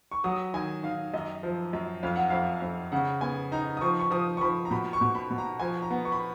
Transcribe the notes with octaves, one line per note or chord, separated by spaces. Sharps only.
C#6
F#3 D#6
D#3 G#5
D#3 F5
F#2 D#5
F3
F#2
F2 F5
F#5
F2 F5
F2
C#3 F#5
B3 G#5
D#4 A#5
D#6
F3 C#6
C#6
F3 D#6
C#6
F3 B5
A#5
B2 B5
C#6
B2
B5
B2
A#5
F3 G#5
A#5
B3
C#6
B5